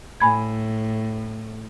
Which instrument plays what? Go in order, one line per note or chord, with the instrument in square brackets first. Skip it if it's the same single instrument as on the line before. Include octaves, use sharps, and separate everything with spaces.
[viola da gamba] A2 [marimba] G#5 B5 G#6